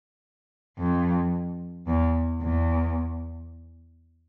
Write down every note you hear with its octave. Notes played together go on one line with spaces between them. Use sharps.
F2
E2
E2